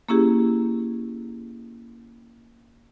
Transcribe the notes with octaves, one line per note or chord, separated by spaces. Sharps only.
A#3 C#4 E4 G4 G#4